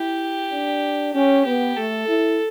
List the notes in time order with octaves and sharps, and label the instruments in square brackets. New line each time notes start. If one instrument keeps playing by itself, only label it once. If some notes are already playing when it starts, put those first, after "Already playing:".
Already playing: [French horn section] E4 [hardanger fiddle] G4
[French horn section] D4
[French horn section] C#4 [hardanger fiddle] G4
[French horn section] B3 [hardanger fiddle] G4
[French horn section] A3 [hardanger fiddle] A4
[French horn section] E4